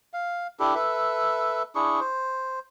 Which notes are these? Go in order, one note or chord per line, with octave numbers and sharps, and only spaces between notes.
F5
D4 E4 G4 A4
A4 B4 E5
D4 E4 G#4 C#6
C5